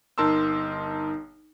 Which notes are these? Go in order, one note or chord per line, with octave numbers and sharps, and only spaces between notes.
G1 D#4 A#4 A5 C6 E6